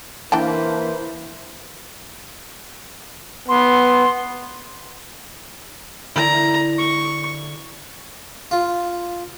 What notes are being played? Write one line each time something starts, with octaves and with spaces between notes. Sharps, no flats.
E3 A#3 D4 B4 C5 G5 A5
B3 C6
D3 E4 D5 A#5
C#6
F4